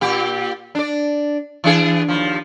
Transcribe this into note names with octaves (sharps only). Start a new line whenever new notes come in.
A#2 G4
D4 D5
E3 D4 G#4
D#2 F3